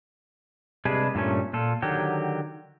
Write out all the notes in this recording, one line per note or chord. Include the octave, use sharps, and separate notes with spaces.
C3 G3 G#3 D4 G#4 B4
G2 A#2 A3 C#4
A#2 F4 A4
D3 D#3 F#3 G4